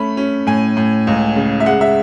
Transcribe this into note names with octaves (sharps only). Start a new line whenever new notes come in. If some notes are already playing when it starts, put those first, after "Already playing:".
Already playing: A3 C#4 B5
C#4
A2 G#5
A2
C#2
C#3
E5
G#3 F#5
E5